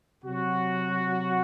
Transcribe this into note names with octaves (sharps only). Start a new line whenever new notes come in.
C3 F#3 F#4